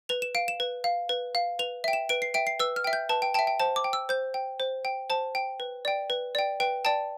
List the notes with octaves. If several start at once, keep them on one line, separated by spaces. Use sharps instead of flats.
B4 F7
E7
F5 D7
E7
B4
F5
B4
F5
B4 F7
E5 G5
E7
B4 D7
C7
E5 G5 D7
C7
B4 E6
F6
E5 G5
G6
B4 A5
G5
G5 A5
E5
G5
C5 A5
D6
G5
E6
C5 G6
G5
C5
G5
C5 A5
G5
B4
D5 G5
B4
D5 G5
B4 G5
D5 G5 A5